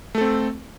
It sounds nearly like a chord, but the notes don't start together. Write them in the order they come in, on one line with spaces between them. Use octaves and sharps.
A3 A4 C4